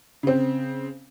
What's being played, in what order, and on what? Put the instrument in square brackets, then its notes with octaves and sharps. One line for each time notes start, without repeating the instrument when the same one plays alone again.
[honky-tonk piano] C#3 C4